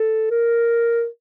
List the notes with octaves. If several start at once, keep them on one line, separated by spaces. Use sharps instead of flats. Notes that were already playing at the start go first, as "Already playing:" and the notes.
Already playing: A4
A#4